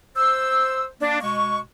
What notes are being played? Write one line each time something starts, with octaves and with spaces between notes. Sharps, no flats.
C5 E6
A#3 D4
B2 G#3 C#6